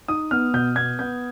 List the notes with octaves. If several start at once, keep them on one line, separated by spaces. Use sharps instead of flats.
D#4 D#6
B3 F6
B2 G6
B3 G#6
B3 G6